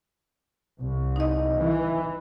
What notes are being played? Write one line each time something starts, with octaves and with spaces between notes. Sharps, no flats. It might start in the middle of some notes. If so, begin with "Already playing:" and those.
C2
D#4 D#5
E3